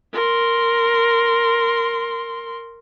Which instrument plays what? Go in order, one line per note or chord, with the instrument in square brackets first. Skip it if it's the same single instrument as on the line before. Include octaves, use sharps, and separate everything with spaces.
[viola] A#4 C6